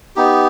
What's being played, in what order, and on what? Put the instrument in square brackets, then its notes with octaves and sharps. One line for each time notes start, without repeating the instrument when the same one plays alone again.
[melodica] B3 D#4 G4